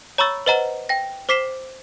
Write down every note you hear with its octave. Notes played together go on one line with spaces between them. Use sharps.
C#5 A#5 B5 C#6 E6 A6
B4 C5 D#5 F#5 A#5
G5 A#6
C5 D6 B6 C7 E7 G7